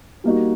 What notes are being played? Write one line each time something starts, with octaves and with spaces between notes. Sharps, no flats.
G3 A#3 D#4 F#4